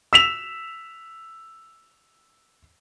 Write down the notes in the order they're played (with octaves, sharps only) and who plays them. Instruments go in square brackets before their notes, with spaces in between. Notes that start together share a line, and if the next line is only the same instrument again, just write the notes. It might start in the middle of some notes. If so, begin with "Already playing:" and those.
[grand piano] E6 B6 E7 F7